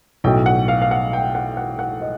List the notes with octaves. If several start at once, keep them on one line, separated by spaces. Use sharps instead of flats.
B1 A2 F#3 G5
F#5
F5
F5
F#5
G5
F#5
F#5
F#5
D#5